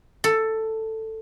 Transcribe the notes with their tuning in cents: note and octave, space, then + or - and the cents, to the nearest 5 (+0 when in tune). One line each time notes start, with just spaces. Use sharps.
A4 +10